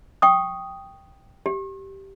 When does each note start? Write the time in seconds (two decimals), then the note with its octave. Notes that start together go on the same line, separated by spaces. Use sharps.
0.22 G5 C#6 D#6
1.46 G4